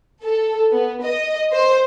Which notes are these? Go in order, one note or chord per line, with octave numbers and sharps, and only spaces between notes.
A4
B3
D#5
C5